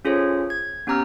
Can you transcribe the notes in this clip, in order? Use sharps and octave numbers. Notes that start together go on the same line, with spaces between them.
C#4 F4 G#4 A4 C5 C#5
G#6
B3 C#4 G4 A#5 E6 F6